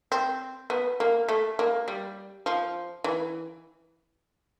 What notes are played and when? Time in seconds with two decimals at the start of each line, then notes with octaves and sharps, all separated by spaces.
0.12 C4
0.70 B3
1.00 A#3
1.29 A3
1.59 A#3
1.88 G3
2.46 F3
3.04 E3